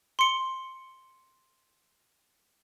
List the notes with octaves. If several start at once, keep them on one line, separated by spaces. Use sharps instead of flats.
C6 C#7